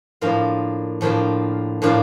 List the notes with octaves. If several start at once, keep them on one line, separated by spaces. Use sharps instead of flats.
A2 F3 A#3 D4 F4
A2 F3 A#3 D4 F4
A2 F3 A#3 D4 F4